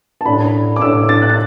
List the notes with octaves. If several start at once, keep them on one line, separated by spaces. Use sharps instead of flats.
A5
A1 A2 A3 D4 B5
D6
A1 A2 A3 D4 E6
A6
F#6
A6